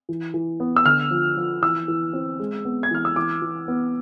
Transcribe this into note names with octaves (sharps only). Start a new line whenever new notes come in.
E3
E3
B3
E6
D3 F6
F3
F3
E3 E6
E3
C4
G#3
B3
G#6
E3 F6
E6
E3 D6
E3
B3